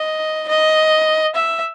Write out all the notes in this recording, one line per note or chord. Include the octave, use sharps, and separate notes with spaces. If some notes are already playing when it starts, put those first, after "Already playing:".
Already playing: D#5
D#5
E5